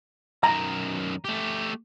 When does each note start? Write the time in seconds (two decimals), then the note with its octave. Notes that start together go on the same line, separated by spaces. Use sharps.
0.44 F#2 D#3 A#5
1.25 A3 G4